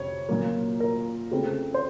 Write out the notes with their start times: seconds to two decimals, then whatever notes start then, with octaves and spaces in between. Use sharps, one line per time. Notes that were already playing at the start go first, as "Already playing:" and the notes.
Already playing: F2 C3 C#5
0.29 A#2 F#3 A#3
0.80 A#4
1.31 C#3 A3 C4
1.74 C5